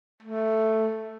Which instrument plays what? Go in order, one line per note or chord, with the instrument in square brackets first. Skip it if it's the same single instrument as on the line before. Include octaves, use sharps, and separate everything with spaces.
[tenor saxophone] A3